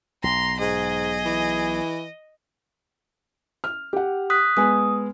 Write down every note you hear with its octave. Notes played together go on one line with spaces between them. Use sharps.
B1 A#5 C6
G#2 G#4 D#5
E3
F6
G4 F#5
D#6 F#6 B6
G#3 B3 G#5 D#6